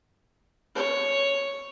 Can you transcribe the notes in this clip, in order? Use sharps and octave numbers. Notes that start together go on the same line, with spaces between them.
C#5